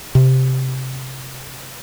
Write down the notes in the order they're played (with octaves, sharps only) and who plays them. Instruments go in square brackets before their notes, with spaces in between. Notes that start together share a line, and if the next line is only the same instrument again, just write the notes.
[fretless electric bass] C3